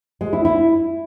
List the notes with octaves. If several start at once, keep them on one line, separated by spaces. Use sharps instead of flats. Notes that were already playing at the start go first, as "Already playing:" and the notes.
G#3
E4
E4